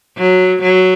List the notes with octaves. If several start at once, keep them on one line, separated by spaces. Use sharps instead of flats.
F#3
F#3